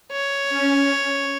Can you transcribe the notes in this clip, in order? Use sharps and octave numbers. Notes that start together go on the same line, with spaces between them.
C#5
C#4